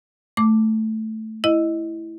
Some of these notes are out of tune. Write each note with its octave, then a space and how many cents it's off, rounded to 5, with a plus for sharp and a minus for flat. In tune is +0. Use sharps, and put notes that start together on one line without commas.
A3 +0 D6 +0
E4 +0 D#5 +0